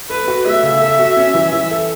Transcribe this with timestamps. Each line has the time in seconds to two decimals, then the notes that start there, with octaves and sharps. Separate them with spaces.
0.10 A4 B4
0.28 F#4
0.46 A3 E5
0.63 C#3
0.82 A4
0.99 F#4
1.17 C#4
1.34 E3
1.52 E3
1.71 A4